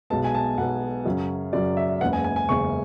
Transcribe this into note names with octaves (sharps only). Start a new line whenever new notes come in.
B1 B2 G#3 B3 A5
G#5
A5
B1 B2 G#3 B3 F#5
F#2 C#3 F#3 C#4
F#2 C#3 F#3 C#4 D5
E5
F#1 E2 C#3 G#3 B3 F#5
G#5
G#5
G#5
F#1 E2 C#3 G#3 B3 C#6